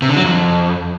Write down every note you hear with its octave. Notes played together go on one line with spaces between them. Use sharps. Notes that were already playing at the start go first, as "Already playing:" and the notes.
C3
D3
F#3
F2